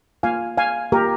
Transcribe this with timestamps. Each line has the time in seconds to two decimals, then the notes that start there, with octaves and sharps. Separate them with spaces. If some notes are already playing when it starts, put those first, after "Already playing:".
0.23 A#3 F4 F5 G#5
0.58 F5 G#5
0.92 A#3 F4 G4 A#4